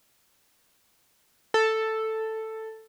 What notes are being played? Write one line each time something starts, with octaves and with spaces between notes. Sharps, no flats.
A4